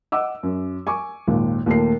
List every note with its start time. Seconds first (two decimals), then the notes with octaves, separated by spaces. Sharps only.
0.12 D#5 F#5 D6 E6
0.43 F#2
0.87 G#5 C#6 D6
1.27 G#1 D#2 A#2
1.66 D#2 A#2 A3 A#4 C7